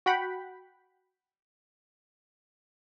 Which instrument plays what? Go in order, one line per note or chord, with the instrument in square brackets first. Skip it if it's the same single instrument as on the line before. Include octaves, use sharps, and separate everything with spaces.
[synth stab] F#4 F#5 G5 B5